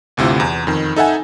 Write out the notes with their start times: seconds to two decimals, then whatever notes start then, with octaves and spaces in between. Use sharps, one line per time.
0.17 G1 D2 C3 E4 F4
0.40 E2
0.67 F2 D#3
0.96 D#4 A4 E5 F#5 G#5